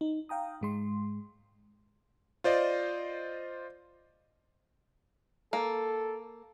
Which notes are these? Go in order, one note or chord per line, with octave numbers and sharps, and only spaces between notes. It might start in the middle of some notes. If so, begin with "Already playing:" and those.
D#4
F5 G5 A#5 D#6
G#2 G#3 C6
F4 C5 D5 D#5
A#3 A4